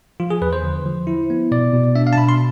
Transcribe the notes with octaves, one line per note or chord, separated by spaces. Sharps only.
F3 F4
G#4
E2 B4
C5
D3
F3
E4
B3
B2 D5
B2
D4 E5
F5
A5
B2 B5
C6